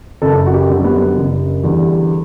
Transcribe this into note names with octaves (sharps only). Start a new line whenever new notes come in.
F#1 A4
F#4
G4
F#2 D3 G3
B3
F#1
E2 D3 G3